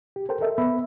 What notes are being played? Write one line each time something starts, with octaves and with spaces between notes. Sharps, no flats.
G4
A4 A#4 C5 G5
A4 A#4 D#5 E5
B3 E5 B5